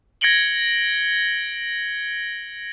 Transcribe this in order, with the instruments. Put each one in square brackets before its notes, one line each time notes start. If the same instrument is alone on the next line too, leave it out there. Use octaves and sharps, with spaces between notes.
[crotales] G#6 A#6 C#7 D7 F#7 G7